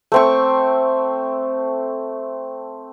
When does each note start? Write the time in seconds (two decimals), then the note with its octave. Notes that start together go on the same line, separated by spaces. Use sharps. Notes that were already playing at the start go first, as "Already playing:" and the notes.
0.12 A3 C4 C#6